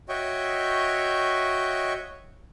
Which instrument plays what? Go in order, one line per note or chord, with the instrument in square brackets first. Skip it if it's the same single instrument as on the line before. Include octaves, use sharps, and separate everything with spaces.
[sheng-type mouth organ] F#4 C#5 D#5 E5 G5 C#6